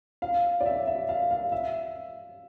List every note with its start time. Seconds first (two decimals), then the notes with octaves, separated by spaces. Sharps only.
0.22 F5
0.60 D5
0.66 E5
0.87 E5
1.09 F5
1.31 F5
1.52 E5